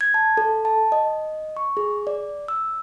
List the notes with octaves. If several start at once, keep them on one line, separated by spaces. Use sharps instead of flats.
G#6
A5
A4
A5
D#5
C#6
G#4
D5
E6